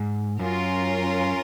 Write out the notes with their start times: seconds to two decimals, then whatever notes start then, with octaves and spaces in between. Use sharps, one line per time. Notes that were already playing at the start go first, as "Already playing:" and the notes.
Already playing: G#2
0.39 F#2 C#4 F4 A#4